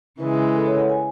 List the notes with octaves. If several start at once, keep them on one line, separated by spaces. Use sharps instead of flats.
C#3 E3 G#3 B4
A4
C#5
F#5
G#5